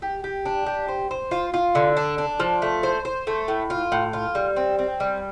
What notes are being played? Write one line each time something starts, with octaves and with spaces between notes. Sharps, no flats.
G4
G4
D4
G4
C5
C5
F4
F4
D3
D4
D4
F3
A3
C5
C5
A3
A2
F4
A2
F4
G3
C4
C4
G3